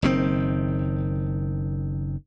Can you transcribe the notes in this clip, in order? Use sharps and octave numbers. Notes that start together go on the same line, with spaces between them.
F#1 D#3 C4